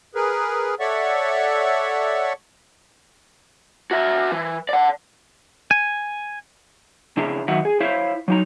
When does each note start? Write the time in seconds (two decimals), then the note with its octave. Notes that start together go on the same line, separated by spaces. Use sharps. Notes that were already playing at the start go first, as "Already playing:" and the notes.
0.15 G#4 A#4 B4
0.80 A4 C#5 D5 E5 F#5 C#6
3.91 F#4 E5
4.32 E3
4.69 D5 F#5
5.71 G#5
7.17 C#3 D4 E4 G#4 E5 A#5
7.48 D#3 F#3 D#5 E5 F#5
7.65 G#4
7.80 E4 C5 C#5 E5 F5
8.28 F#3 D#4 A#5